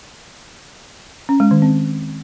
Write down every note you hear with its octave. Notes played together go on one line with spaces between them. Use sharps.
C#4
G#3
D#3
C4